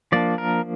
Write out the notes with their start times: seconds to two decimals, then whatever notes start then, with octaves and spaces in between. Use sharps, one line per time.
0.12 F3 A#3 D4 D5
0.38 A#4